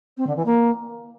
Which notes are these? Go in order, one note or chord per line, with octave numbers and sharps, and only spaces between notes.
C4
D3
E3
A#3